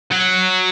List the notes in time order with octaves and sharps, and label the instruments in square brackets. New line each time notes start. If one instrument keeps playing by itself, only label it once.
[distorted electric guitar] F#3